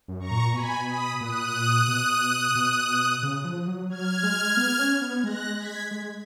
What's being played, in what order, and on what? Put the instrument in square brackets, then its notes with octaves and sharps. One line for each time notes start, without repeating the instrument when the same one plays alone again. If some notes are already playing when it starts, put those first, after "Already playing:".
[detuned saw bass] F#2
[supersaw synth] A#5 C#6
[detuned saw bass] A#2
[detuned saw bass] B2 [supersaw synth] G#5 B5
[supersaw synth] B5 D#6
[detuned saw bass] A#2 [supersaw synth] D#6 F#6
[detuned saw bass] B2
B2
C#3
F3
F#3
[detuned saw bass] F#3 [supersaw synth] F6 G#6
[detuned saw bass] G#3
B3
C#4
B3
[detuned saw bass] G#3 [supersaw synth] F#6 A#6
[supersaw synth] G#6 B6
[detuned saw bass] G#3